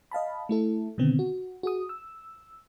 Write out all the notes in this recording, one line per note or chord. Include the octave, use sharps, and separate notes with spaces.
D#5 F5 A5 B5
A3 E4 A4
B2 D3 D#3 B3 C4
F#4
F#4 G#4 D#6
E6